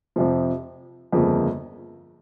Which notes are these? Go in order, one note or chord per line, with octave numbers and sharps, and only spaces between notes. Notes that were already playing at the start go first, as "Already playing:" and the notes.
F2 C3 F3
G1 F2 C#3 F3 A#3